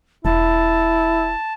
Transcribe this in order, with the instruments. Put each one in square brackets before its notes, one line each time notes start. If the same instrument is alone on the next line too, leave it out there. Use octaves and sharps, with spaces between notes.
[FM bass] E1 [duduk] E4 [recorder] A5